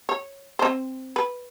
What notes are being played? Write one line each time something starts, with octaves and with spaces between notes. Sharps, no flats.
C#5
C4 C5
B4